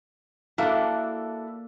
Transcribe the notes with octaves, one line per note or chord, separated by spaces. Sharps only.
A#3 D4 E4 F#4 A4